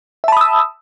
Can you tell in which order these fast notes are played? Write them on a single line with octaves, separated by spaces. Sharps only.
E5 A5 B5 D#6 E6